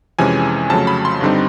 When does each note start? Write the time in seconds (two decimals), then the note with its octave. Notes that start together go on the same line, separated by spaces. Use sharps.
0.19 F2 C3 E3 G#3 C#4 G#5
0.70 F2 C#3 F#3 A3 A5
0.87 B5
1.05 C6
1.21 G2 D3 G3 C4 D#4